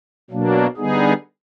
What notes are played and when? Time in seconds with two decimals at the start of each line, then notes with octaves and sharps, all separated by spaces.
0.30 B2 F#3 A#3 D4
0.77 D3 G3 B3 D#4 G#4